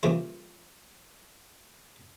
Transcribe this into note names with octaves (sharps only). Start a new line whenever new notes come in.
G2 A#2 C#3 E3 C5